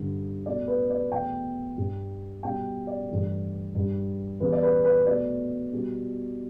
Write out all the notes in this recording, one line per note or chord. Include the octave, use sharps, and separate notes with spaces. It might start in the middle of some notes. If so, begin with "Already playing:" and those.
Already playing: G2 D3 G3
B2 A3 D5
B4
D5
E2 B2 A3 G5
G2 G3
B2 G3 G5
D5
G2 E3 A3
G2 G3
E2 E3 G3 B4
D5
B4
B4
B2 A3 D5
B2 G3